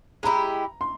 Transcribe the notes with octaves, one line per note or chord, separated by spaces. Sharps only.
G#3 E4 G4 A#5
C6